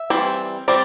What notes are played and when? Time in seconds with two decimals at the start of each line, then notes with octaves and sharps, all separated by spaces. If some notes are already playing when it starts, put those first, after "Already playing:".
Already playing: E5
0.10 E3 G3 C4
0.68 G3 C4 D5